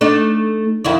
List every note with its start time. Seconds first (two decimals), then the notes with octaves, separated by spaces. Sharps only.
0.01 A3 D4 D#4
0.85 F2 D#3 E4